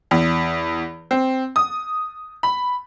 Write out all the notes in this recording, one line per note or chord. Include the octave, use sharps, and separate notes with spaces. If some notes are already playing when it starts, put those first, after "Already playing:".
E2
C4
D#6
B5